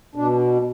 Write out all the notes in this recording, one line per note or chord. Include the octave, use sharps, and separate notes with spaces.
B2 D4